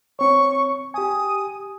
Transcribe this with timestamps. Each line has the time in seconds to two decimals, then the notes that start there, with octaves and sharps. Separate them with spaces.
0.19 C4 C#5 C#6
0.94 G4 G#5 D#6